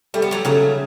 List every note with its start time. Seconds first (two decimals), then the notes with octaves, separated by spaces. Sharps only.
0.14 G3 A3
0.22 B3
0.31 F#3 A3
0.45 C#3 F#3 A3